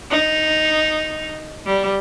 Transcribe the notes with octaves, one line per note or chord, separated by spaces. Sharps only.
D#4
G3